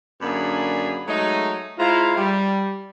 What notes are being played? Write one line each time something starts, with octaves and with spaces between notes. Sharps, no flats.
F#2 D3 A#3 D4 G#4 B5
F#3 G#3 A3 D#4
G#3 E4 F4 C5 F5 A#5
G3